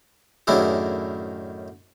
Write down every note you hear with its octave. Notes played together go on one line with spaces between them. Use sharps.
F#2 A2 D#3 D4 E4 G#4